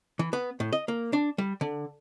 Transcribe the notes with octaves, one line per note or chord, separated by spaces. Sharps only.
E3
B3
A2
D#5
A#3
D4
G3
D3